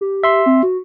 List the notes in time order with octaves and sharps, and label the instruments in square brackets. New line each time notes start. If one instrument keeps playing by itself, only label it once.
[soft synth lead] G4
[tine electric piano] E5 C6
[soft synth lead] C4
F#4